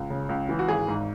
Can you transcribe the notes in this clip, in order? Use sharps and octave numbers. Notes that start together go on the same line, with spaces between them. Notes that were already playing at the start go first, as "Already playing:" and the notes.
Already playing: C#2
C#3
C#2
E3
F#4
G#1 G#4
G#2